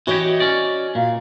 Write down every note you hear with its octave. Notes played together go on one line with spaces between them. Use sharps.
E3 F#4 G4 C#5 D#5
C#4 D5
A#2 F5